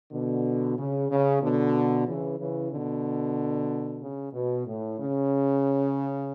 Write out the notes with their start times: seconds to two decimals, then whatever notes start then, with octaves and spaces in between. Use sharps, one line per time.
0.12 B2 D3
0.77 C#3
1.10 C#3
1.42 B2 D3
2.07 C#3 E3
2.39 C#3 E3
2.71 B2 D3
4.01 C#3
4.33 B2
4.66 A2
4.99 C#3